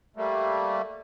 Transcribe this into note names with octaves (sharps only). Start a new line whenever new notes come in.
G3 A3 A#3